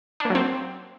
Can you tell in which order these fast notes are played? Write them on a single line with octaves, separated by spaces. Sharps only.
D4 A#3 F#3 C4